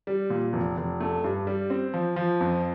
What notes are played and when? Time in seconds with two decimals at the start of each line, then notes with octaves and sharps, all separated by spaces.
0.07 G3
0.30 A#2
0.53 F1
0.77 F1
1.00 A3
1.24 G2
1.47 G3
1.70 C4
1.94 F3
2.16 F3
2.41 F2